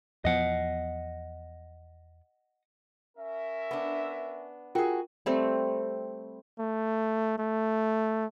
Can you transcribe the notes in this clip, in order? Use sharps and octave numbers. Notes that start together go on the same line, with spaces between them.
E2 F3 B3 D#5 F#5
C#4 A#4 E5
B3 D4
F4 F#4 G#4 A#4 G5
G3 A3 C4
A3
A3